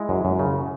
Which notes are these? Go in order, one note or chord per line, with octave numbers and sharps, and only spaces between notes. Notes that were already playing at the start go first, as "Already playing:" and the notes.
Already playing: G#3 E4
F#2
F#2
C#3